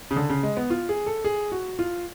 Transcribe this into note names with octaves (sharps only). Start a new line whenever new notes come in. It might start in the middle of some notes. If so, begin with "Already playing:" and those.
C#3
D3
C#3
G#3
B3
F4
G#4
A4
G#4
F#4
F4